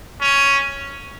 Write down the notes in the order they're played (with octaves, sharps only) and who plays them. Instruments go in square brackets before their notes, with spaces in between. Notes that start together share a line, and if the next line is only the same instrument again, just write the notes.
[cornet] C#4